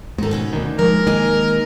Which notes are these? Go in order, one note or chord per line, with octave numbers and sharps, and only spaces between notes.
G#2 D#3 D#4 A4
B2 C#4 D#4
D2 D#3
F3 G#3 A#3 A#4
D#3 G#3 A#3 D#5 G#5